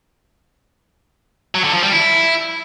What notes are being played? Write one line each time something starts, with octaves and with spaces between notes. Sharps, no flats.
F#3
D3
F3
G3
E4